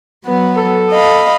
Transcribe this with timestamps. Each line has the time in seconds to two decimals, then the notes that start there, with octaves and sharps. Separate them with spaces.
0.25 F#3 B3
0.57 A4
0.90 D#5 F5 B5